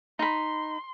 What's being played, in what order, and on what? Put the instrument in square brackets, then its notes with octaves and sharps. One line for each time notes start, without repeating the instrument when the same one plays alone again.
[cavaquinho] D#4 B5 [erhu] C6